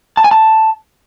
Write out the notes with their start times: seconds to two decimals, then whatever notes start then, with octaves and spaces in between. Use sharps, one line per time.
0.17 A5
0.24 G#5
0.31 A5